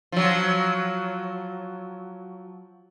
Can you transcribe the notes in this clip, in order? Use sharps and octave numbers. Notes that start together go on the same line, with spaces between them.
F3 F#3